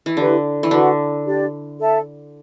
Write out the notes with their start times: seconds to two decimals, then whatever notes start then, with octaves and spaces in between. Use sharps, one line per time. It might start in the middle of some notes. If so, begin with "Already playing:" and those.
0.06 E3
0.17 D3 E4 G4 B4
0.63 E3
0.71 D3 D4 F#4 B4 F#5
1.25 D4 G4 D5
1.79 A4 E5 A5